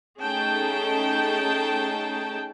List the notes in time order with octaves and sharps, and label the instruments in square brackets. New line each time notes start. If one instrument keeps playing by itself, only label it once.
[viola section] A3 C#4 D#4 G#4 G5 A5